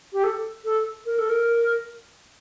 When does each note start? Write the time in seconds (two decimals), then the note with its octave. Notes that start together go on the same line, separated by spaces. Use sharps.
0.13 G4
0.24 A4
0.65 A4
1.06 A#4
1.18 A4
1.29 A#4